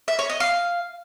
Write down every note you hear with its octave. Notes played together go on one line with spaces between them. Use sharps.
E5
C#5
D#5
F5